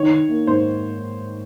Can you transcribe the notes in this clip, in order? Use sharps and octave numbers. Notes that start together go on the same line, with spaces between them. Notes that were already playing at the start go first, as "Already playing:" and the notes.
Already playing: D#3 C#5
D#3
A#3
G#2 C5